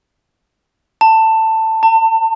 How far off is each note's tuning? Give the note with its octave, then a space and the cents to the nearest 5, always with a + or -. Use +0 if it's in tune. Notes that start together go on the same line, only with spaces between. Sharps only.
A5 +15
A5 +35